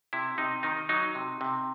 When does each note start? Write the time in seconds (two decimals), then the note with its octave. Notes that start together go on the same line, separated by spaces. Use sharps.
0.13 C3 E4
0.38 C3 D#4
0.63 D#3 D#4
0.89 F#3 D#4
1.15 C3
1.41 C3